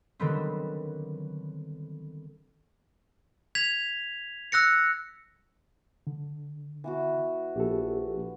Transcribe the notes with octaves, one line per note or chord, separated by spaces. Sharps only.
D3 D#3 F#3 G3 B3 C4
G#6 B6 F7
E6 F#6 A#6 C#7
D3
E3 B3 F#4
A#1 G4 A4